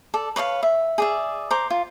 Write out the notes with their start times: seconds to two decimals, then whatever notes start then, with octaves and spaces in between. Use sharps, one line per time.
0.14 A4 D5
0.36 B4 C#5 D#5 F5
0.63 E5
0.98 G#4 D5 E5
1.51 C5 A#5 D6
1.70 F4